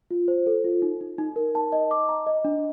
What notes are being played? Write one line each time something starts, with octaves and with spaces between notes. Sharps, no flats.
F4
C5
A4
F4
D#4
D#4
D#4
A#4
A5
D#5
D6
A#5
D#5
D4